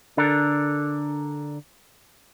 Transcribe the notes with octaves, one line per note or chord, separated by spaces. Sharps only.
D3 D4 A4 A#4